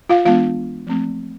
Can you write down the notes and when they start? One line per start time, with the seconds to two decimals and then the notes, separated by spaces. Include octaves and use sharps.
0.09 F4 F5
0.25 E3 G#3 B3 D4 F4 F5
0.87 F3 A3 C4